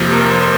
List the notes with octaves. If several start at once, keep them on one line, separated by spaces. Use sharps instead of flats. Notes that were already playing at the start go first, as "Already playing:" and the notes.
Already playing: F2 C3 F3 A#3
A#4
C5
C5